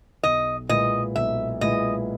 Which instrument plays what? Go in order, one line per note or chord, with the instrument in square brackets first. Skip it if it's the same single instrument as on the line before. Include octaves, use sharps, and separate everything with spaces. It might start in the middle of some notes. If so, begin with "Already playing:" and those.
[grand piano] B1 [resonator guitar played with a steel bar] D#5
[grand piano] A#2 G#3 B3 E4 [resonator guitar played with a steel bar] D#5
[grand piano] B1 [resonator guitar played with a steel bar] E5
[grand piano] A#2 G#3 B3 E4 [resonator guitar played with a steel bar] D#5